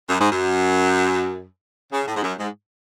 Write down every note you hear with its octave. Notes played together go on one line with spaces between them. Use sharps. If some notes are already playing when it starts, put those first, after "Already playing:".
F#2
G#2
F#2
C#3
A2
G#2
F#2
G#2